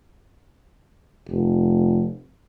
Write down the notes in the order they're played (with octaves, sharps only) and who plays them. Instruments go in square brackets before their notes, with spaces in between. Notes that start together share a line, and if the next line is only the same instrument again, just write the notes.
[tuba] F1